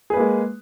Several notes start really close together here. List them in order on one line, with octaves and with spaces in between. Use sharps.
G#4 B4 A#3 G#3